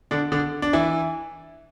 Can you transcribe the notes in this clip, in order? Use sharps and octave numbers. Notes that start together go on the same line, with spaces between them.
D3 D4
D3 D4
D4
E3 E4